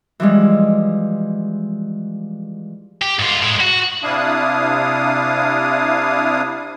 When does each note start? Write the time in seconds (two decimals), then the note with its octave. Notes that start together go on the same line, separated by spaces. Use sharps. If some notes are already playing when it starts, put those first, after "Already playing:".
0.20 E3 F3 G3 G#3
3.01 G4
3.19 G#2 F4
3.42 A2 G#3
3.60 F#4
4.03 C3 D4 E4 F5 D#6